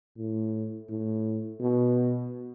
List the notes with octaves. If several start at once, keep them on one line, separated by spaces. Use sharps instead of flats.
A2
A2
B2